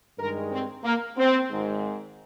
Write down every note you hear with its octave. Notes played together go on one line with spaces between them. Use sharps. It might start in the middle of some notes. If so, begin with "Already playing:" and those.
G2 D#3 G#3 A#4
C4
A#3
C4
G#1 G#2 D#3 G#3